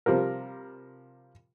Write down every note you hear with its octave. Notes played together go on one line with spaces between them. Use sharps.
C3 F3 G3 A#4